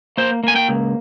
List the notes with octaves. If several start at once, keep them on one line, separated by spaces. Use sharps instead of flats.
A#3 C5
A#3 G#5
G5
C#2